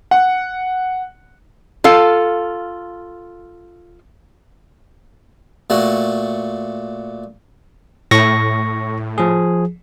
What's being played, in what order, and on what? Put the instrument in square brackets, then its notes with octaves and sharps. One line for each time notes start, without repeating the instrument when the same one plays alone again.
[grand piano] F#5
[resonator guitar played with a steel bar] F4 A4 F5
[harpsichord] A#2 A3 F#4
[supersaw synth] A2 [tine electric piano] C#6 A#6
[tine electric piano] F3 G#4